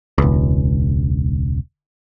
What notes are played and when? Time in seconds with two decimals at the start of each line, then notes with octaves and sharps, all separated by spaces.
0.18 E1 C#2